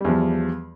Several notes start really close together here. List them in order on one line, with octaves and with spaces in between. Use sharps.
G3 E2 F3